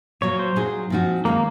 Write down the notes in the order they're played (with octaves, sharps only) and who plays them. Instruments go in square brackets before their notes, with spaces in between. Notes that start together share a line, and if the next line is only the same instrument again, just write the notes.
[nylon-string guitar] A#2 F#3 A#3 [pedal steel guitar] C#5
[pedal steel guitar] C5
[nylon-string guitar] A#2 F#3 A#3 D#4 G#4
A#2 F3 C4 D#4 F#4
[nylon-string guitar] D#3 G#3 C#4 [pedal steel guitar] A#3